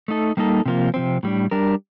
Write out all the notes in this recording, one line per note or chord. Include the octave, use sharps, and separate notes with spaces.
A3 D#4 A4
G3 A#3 D#4 A4
C3 F3 A#3 F4
C3 F3 C4
A2 G3 D4
G3 D4 G4 A#4